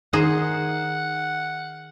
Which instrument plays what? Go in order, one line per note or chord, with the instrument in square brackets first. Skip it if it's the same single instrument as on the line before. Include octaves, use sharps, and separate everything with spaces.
[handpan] D#3 [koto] D#4 G#4 C5 [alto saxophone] F#5